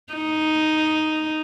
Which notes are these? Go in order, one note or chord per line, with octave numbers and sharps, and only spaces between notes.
D#4